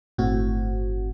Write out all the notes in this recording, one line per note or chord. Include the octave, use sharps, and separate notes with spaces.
G1 A2 C4 F#4